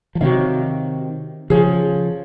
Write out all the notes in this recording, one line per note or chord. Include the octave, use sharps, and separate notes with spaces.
F3
C3 D#3 F#4 C#5 F5
C#3 F3 G#4 C#5 G#5